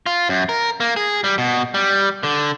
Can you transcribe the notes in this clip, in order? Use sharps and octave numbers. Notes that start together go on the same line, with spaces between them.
F4
F#2
A#4
A#3
G#4
G3
B2
G3
D3